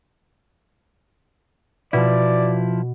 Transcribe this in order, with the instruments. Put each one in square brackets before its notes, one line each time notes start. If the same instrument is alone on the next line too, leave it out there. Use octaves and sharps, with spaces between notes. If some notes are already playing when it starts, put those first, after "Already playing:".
[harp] B2 [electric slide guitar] F3 E4 [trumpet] D5